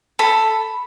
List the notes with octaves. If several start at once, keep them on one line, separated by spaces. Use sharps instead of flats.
A4 B5